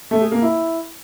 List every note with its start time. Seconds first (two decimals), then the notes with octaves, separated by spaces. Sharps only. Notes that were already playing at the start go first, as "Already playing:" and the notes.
0.11 A3
0.21 G#4
0.32 A#3
0.42 E4